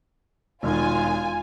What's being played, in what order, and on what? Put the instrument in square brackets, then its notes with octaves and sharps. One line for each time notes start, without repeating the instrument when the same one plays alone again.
[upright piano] E1 D#3 [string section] F4 G#5